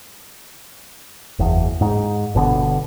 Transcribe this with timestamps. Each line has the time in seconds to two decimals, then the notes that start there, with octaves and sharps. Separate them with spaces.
1.39 F#1 E2
1.81 G#2
2.35 G1 B2 D3 B3